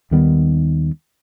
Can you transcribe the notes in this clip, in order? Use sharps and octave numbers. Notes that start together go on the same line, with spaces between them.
D#2 D#3 G3 B3